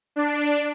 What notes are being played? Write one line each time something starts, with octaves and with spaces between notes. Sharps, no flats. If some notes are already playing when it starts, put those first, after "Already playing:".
D4